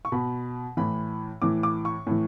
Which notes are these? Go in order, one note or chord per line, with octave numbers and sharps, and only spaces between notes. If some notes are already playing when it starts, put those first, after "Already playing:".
C#6
B2 B5
A2 E3 B5
A2 E3 D6
D6
C#6
A2 E3